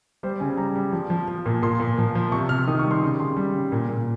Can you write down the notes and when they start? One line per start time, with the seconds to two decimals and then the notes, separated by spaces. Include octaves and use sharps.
0.23 G3 C5
0.40 C#3 G#5
0.57 G3 A#5
0.76 G3
0.92 F3
1.10 F3
1.28 F3
1.46 A#2
1.62 A#2 C6
1.80 A#2
1.98 F3
2.15 F3
2.32 C3 C#6
2.49 C3 F6
2.67 D#3 D#6
2.79 C#6
2.85 G3
2.91 C6
3.02 C#3
3.19 C#3 C6
3.37 G3
3.54 C#3
3.72 A#2
3.88 A#2